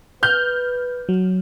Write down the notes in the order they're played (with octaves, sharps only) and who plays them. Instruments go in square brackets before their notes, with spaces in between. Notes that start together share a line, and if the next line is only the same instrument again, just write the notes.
[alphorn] B4 [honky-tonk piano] F6 G6
[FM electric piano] F#3